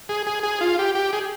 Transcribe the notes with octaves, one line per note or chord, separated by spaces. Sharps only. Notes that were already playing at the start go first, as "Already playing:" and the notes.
G#4
G#4
G#4
F4
G4
G4
G#4